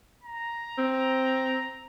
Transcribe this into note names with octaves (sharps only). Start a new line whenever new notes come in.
A#5
C4